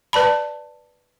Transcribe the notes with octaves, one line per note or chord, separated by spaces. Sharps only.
B4 D5 A5 B5